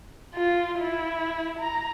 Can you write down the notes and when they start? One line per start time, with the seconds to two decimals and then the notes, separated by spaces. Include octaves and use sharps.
0.34 F4
0.79 E4
1.59 A#5